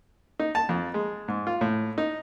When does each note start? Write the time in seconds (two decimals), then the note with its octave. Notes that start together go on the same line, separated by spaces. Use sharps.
0.39 D#4
0.55 A5
0.69 F2
0.94 G#3
1.28 G#2
1.47 F4
1.61 A2
1.98 D#4